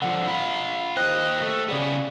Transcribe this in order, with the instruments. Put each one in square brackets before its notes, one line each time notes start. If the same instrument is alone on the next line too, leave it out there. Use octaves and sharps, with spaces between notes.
[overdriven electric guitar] D3 F3 [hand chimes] F#5
[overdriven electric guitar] F4 B5
[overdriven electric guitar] D#2 D#5 [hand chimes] C5 G5 F#6
[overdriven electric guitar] A3
[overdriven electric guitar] C#3 B3 [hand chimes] G#4 D5